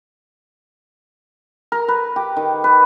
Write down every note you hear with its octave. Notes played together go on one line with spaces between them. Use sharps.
A#4
B4
G4
D#3
B4